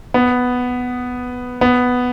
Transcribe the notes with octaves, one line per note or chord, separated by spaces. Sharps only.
B3
B3